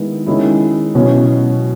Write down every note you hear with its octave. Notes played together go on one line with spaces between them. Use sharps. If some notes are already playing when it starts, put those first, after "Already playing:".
Already playing: D#3 G#3 B3 E4
D#3 G#3 C#4 E4
B2 F#3 C#4 E4